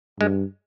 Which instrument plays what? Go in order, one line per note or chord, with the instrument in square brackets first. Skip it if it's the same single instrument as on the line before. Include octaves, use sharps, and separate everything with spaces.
[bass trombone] G2 [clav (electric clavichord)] G#3